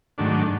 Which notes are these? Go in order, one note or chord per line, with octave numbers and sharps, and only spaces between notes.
G#2 D#3 F#3 A3 D4